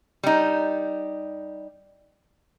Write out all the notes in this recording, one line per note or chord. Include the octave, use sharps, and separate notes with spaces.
G3 D#4